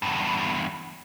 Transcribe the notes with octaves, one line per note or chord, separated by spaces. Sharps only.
E2 G2